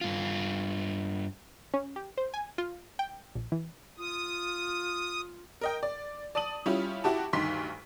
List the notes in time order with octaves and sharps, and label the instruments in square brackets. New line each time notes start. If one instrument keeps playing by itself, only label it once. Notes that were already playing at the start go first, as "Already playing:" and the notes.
[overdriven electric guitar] G2 F4
[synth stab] C#4
G4
C5
G#5
F4
G5
A#1
E3
[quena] F4 [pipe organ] D#6
[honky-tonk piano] A#4 D#5 G5
D5
D5 A5 D#6 D#7 F#7
G3 C#4 E4 F4
E4 F#4 G4 A5
D2 G2 D#3 C6 B6